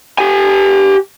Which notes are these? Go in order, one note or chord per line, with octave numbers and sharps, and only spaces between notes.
G4 G#5